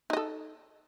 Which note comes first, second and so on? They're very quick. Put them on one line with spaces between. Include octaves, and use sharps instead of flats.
D#4 D#5 A4